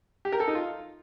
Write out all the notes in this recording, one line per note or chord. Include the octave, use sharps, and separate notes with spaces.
G4
A#4
A4
D#4
F4